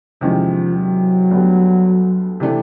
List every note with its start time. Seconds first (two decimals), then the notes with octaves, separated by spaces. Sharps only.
0.21 E2 C3 D#3 F3 G#3 C#4
0.76 F#3
1.31 D2 D3 G3 B3
2.40 C3 E3 A3 D4